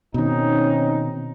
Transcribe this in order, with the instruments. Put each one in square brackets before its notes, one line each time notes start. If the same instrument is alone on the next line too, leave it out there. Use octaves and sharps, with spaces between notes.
[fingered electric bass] B2 D#3 [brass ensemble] C4 C#4 D#4